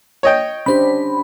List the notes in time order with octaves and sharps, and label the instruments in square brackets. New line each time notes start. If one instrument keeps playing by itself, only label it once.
[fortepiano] C#5 D#5 G5
[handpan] C#4 D4 G4 [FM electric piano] C5 B5